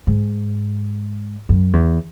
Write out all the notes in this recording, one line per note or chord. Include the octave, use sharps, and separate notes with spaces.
G#2
F#2
E2